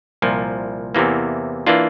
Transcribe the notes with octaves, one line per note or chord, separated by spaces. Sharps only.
C2 A#2 F3
E2 C3 E3 A#3
E3 A#3 D4 F4